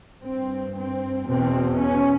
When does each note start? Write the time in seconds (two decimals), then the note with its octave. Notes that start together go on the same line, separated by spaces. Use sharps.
0.23 G2 C4
0.76 C4
1.27 E2 B2 C4
1.78 C#4